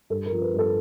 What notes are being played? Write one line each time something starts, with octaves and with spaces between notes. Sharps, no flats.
G2 A4
A#4
F3
B4
G2
A4